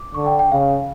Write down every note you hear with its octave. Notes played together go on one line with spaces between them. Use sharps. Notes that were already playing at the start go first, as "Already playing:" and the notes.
Already playing: D6
D3 C#6
G5
G5
C#3 F5